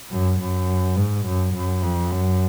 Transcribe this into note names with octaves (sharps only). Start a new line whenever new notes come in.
F#2
F#2
G#2
F#2
F#2
F2
F#2